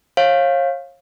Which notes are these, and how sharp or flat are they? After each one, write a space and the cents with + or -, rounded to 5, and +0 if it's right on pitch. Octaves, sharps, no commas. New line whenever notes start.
C#5 -35 F5 +0